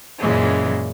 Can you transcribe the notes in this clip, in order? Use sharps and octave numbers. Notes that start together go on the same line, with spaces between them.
F#2 A#2 C#3 E3 G#3